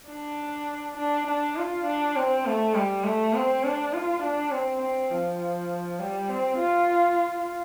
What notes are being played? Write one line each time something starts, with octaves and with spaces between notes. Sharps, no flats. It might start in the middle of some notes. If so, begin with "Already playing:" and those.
D4
D4
D4
F4
D4
C4
A3
G3
A3
C4
D4
F4
D4
C4
C4
F3
G3
C4
F4